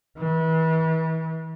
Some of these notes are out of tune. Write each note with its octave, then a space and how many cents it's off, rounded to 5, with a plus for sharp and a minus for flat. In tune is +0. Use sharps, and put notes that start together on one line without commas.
E3 -35